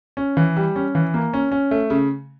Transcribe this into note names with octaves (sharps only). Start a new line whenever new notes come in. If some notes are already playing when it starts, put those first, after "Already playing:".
C#4
E3
G3
C#4
E3
A#3
C#4
C#4
A3
C#3